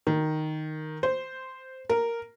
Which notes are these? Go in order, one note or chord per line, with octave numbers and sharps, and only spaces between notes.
D#3
C5
A#4